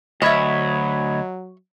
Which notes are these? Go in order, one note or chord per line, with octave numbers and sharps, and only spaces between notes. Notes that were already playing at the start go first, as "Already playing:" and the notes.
D2 F#3 C#5 D#5 E5 B5 G#6